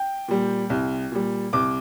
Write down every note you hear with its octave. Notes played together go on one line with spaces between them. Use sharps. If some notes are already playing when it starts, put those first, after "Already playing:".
Already playing: G5
A#2 G3
C2
A#2 G3
C2 D6